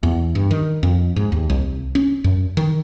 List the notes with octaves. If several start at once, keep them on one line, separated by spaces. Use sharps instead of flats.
E2
G2
D#3
F2
G#2
D#2
C2
C#4
F#2
D#3